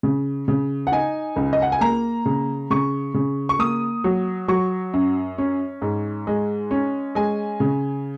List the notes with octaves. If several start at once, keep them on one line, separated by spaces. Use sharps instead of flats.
C#3
C#3
F#5
D#4 G#5
C#2
D#5
F#5
G#5
A#3 A#5
C#3
C#3 C#6
C#3
C#6
A#3 D#6
F#3
F#3 C#6
F#2
C#4
G#2
G#3
C#4
G#3 G#5
C#3